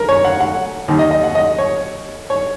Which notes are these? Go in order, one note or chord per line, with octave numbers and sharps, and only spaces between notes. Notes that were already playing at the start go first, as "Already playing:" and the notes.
Already playing: A#4
C#5
F#5
F#5
D#2 D#3
D#5
D#5
F#5
D#5
C#5
C#5